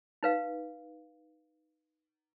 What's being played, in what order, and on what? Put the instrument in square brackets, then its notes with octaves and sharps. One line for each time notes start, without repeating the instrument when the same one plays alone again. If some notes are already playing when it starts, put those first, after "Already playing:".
[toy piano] D#4 B4 F5